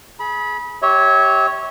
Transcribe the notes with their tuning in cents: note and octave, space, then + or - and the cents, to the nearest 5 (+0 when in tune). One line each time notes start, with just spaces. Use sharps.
G#4 +25 B5 -25
G4 -15 C#5 +0 E5 -30